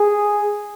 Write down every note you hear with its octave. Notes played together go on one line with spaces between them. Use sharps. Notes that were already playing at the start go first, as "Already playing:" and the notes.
Already playing: G#4